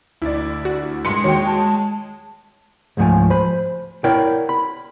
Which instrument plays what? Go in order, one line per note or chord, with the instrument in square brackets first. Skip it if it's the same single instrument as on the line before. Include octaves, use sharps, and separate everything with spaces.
[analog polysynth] D2 [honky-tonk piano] E4 D5
[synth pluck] F#4
[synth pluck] G2 A#2 B4 [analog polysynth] G#3 [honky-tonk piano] C6 C#7
[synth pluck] E2 D#3 A#3 [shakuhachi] F#4 [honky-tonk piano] C#5 G5
[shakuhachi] A5
[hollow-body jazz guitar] C#2 G#2 F3 A3 G#5
C5 B5
E4 A#4 C#5 D5 F#5 G5
B5